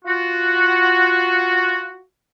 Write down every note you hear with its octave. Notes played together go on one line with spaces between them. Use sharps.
F4 F#4